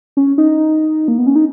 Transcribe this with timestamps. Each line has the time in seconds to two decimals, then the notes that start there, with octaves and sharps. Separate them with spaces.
0.17 C#4
0.38 D#4
1.08 A#3
1.18 B3
1.27 C#4
1.36 D#4